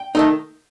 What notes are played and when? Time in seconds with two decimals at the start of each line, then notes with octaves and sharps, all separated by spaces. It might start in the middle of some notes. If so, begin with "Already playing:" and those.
Already playing: G5
0.15 D#3 A3 D#4